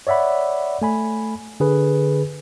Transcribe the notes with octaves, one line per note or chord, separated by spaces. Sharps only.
C#5 D5 E5 F#5 B5
A3 G#5 B5
D3 G#4 B4